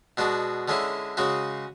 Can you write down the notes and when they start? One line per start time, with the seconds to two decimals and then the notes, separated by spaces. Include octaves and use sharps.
0.17 B2 G#3 D4 F#4
0.68 D3 G#3 C#4 E4
1.17 C#3 G#3 C#4 F#4